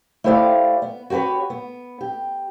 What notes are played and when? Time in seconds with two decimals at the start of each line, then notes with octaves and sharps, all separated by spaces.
0.24 A3 E4 G4 C5 D5 F5
0.82 B3
1.10 F#4 G4 A#4 B4 C#5
1.50 B3
2.01 G4